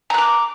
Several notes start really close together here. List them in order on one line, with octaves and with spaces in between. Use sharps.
A#5 F#6 D6